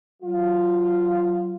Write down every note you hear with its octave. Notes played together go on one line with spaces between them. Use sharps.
F#3 F4